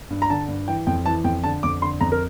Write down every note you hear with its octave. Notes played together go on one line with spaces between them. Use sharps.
G2
A#5
D3 A5
G2
E3 G5
F2 G5
E3 A5
F2 G5
D3 A5
F2 D6
D3 C6
F2 A#5
A#4